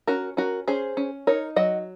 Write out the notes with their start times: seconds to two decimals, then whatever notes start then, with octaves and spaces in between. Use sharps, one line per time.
0.07 C#4 F#4 A#4
0.37 C#4 F#4 A#4
0.68 C#4 G#4 C5
0.97 C#4
1.27 D#4 A#4 C#5
1.56 F#3 D#5 F#5